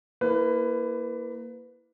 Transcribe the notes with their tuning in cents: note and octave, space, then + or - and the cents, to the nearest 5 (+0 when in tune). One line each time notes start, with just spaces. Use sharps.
A#3 +0 E4 +0 B4 +20